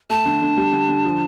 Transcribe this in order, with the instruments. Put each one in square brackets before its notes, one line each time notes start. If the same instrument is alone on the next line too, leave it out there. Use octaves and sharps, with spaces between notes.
[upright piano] A3 [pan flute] A5
[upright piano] D3
D3
G3
D3
D3
F3